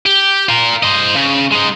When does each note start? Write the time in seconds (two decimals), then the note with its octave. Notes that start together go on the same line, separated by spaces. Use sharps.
0.06 G4
0.48 F4 A#4
0.83 C5 D#5
1.15 C#3
1.51 G#3 D#4